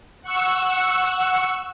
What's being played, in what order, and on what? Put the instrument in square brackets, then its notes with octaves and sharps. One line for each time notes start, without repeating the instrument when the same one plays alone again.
[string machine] F#5 C#6 E6